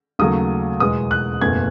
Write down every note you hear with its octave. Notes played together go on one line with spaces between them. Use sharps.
D#2 C#3 F#3 A3 D#6
E2 B2 G#3 D#6
F#6
F#1 E2 B2 A3 G#6